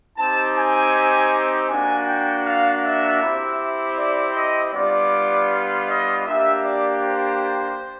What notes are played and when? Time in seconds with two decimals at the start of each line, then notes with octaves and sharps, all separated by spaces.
0.17 C4 D#4 G4 A5
0.56 G#5
1.69 A#3 D4 F#4 G#5
2.08 G5
2.46 F5
2.83 E5
3.22 C4 E4 G4
3.98 D5
4.36 D#5
4.74 G3 B3 D4 F4 D5
5.88 D#5
6.26 A#3 D4 G4 E5
6.64 D5
7.03 C5